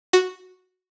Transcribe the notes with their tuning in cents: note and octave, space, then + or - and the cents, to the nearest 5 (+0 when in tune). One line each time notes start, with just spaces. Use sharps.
F#4 -5